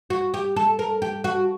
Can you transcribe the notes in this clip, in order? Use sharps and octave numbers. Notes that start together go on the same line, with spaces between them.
F#4
G4
A4
A#4
G4
F#4